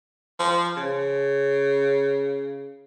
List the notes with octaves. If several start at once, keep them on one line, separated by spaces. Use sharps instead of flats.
F3
C#3